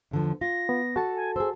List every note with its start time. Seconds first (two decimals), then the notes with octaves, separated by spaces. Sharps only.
0.11 E2 D3 F3
0.41 F4 A#6
0.69 B3
0.96 F#4 A4 A5
1.16 G#5
1.36 G#4 C5 E6